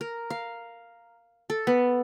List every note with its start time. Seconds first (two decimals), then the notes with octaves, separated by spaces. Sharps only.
0.01 A#4
0.30 F5
1.50 A4
1.67 B3